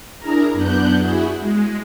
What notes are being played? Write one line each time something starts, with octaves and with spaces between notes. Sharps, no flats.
D4 E4 G#4 A#4 A#5
F#2 B3 D4 F#6 G6
E4 F#4 G#4
G#3